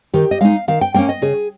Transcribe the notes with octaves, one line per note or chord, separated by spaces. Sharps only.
D#3 G4
D#5
G#3 D#4 F5
D#3 F5
G5
A#3 C#4 G5
D#5
C#3 G#4